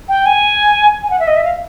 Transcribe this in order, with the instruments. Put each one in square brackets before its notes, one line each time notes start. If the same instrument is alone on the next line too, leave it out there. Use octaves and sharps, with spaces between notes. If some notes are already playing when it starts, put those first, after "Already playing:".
[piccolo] G5
G#5
G#5
F#5
E5
D#5
E5
F5